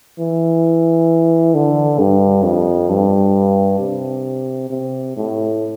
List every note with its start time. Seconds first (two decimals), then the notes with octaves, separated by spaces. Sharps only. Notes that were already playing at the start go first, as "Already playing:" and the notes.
0.19 E3
1.55 D3
1.99 G2
2.44 F2
2.90 G2
3.80 C3
4.70 C3
5.16 A2